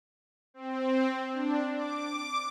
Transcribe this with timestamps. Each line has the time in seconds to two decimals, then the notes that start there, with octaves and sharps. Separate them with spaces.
0.54 C4
1.32 D4
1.75 D6